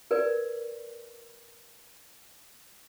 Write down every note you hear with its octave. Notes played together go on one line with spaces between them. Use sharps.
A#4 B4 D5